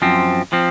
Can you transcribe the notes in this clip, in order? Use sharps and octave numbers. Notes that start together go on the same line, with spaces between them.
F#2 F3 C4
F3 C4